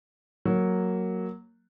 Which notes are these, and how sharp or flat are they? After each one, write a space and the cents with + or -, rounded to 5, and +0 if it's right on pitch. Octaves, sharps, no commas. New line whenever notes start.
F#3 +0 A#3 -10